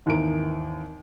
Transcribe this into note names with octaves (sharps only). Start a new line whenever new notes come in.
G#1 D#2 E3 A#4 D7